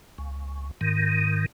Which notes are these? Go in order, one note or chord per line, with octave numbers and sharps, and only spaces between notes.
C#2
G#2 D#3